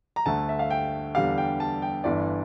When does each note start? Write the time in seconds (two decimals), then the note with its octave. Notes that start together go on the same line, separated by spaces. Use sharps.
0.16 A#5
0.26 D2 D3 A3 A5
0.49 E5
0.59 F5
0.71 G5
1.15 E2 D3 G3 F5
1.38 G5
1.60 A5
1.82 G5
2.04 G1 G2 E3 D5